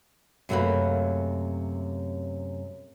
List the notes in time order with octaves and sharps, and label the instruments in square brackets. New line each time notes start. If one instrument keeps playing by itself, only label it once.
[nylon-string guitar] F#2 C3 A3 A#3 F#4 B4